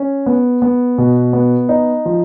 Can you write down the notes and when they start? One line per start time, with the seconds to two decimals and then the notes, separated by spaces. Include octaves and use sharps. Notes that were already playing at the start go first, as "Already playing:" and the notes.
Already playing: C#4
0.26 B3
0.62 B3
0.98 B2
1.33 B3
1.69 D#4
2.05 F3